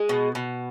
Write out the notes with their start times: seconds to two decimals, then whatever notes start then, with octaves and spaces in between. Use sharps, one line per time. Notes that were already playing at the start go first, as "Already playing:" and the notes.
Already playing: G#3
0.09 B2
0.35 B2